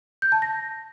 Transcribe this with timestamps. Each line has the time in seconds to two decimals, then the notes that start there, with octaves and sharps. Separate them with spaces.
0.22 G6
0.32 A5
0.42 A#6